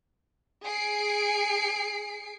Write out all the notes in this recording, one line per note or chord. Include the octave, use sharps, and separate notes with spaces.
G#4 C7 D7